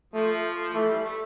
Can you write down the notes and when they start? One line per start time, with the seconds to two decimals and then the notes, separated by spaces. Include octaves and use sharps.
0.14 F3 A3
0.73 E3 A3
0.89 G3
1.04 A3